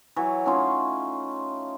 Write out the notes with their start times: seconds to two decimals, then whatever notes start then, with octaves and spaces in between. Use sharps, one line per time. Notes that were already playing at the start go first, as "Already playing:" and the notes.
0.16 E3 F#3 C#5
0.45 A3 C#4 D#4 F4